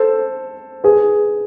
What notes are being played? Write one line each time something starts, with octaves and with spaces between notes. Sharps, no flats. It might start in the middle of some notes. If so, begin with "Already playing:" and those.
Already playing: A4 C5
G#4 B4